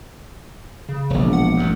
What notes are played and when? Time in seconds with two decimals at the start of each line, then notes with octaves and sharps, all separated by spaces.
0.89 C#3
1.10 E1 A#1
1.33 F#5
1.57 A1 G2